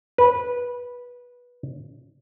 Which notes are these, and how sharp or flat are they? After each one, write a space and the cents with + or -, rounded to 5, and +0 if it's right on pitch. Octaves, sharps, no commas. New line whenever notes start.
B4 -15